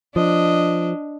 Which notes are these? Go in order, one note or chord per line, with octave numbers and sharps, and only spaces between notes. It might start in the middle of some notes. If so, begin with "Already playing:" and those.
F3 D4 D#5